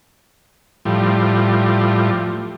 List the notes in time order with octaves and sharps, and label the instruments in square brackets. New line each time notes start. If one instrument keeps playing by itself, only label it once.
[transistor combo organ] A2 F3 G3